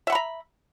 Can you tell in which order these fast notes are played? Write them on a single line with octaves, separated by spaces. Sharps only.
E5 F#5 B5 A#5